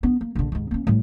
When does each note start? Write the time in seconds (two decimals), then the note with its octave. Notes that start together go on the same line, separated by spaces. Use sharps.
0.03 B3 D4
0.21 A#3
0.35 A#1 D3
0.52 D#2 G#2
0.71 A#3 C#4
0.87 A2 G3